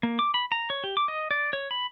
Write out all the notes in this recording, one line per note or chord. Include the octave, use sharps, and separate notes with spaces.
A#3
D6
B5
A#5
C#5
G4
D6
D#5
D5
C#5
B5